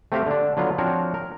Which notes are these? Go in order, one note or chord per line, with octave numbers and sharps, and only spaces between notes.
A3 C4 F#4 G4 E5 F5
D3 D4
D3 F#3 B3 F4
F3 C4 D4 F#4 A#4 C#5
A#4